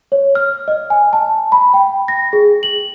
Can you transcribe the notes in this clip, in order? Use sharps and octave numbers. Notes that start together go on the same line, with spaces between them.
C#5
F6
D#5
G#5
A5
B5
G5
A#6
G#4
F#7